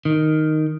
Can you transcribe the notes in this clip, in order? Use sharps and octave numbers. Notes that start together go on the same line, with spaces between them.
D#3